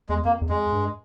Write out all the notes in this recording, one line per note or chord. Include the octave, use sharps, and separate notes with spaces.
E2 G#3
F2 A#3
E2
F2 G#3
G2